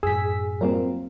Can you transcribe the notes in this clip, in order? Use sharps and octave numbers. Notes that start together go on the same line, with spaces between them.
F#2 A2 G#4 E6 B6
F#3 G3 A#3 C4 F4 A#4